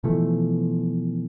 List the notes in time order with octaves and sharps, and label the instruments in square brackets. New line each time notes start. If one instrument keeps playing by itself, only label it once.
[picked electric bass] B2 E3 F3 A3